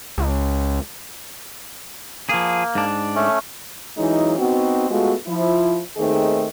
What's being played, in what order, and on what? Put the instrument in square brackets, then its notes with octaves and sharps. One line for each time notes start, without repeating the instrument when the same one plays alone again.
[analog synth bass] C#2
[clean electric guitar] F3 G#4 [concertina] A#3
[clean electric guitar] G#2 D4
[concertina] A3 C#4
[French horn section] E3 F#3 G#3 C#4 D#4
B3 C4 D#4 F#4
G#3 A3 B3 F4 F#4
F3 E4
D#2 D#3 A3 C4 G#4 D#5